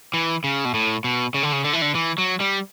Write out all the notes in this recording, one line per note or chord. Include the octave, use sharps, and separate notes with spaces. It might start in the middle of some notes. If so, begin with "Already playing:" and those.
E3
C#3
B2
A2
B2
C#3
D3
C#3
D3
E3
D3
E3
F#3
G3